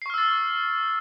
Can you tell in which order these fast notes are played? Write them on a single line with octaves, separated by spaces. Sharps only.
C7 C#6 F6 E6 A6